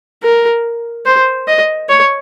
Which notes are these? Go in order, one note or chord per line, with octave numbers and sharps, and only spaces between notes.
A#4
C5
D#5
C#5